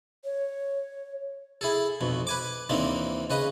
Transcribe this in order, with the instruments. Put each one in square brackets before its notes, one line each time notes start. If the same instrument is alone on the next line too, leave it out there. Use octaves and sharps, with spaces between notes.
[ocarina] C#5
[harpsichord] E4 G#4 A4
B1 F2 B2
B4 G#5 D6
D#2 E3 A#3 C4 D4 D#4
C#3 B4 D#5 D#6